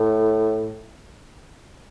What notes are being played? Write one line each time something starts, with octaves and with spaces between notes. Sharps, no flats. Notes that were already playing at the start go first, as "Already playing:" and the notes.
Already playing: A2